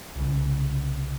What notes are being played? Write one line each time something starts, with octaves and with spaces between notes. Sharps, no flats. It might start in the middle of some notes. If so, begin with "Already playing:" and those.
C2 C#3